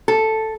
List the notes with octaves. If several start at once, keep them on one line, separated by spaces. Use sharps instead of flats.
A4